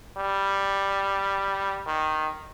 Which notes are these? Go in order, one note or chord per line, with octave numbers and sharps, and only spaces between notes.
G3
D#3